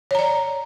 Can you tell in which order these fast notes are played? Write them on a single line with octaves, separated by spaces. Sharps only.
C#5 A#5 D5